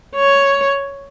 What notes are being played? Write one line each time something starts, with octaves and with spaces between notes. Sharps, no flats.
C#5